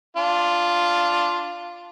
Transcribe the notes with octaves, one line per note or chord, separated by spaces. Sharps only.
D4 F4